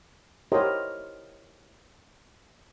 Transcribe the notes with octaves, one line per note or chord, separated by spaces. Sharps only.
E4 G4 A#4 C5 C#5 D#5